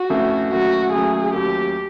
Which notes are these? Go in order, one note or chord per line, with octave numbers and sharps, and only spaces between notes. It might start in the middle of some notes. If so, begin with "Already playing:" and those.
Already playing: F#4
F2 C#3 E3 A3
D#2 C#3 F#3 A3 F#4
D#2 C#3 F#3 A3 G#4
D#2 C#3 F#3 A3 G4